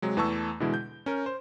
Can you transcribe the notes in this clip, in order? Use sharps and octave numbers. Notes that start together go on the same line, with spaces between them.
C3 F#3 G#3
E2 E3 A3 A5 C#6 E6
B2 D3 E3 G#3 E4
G6
C#4 A#4
C5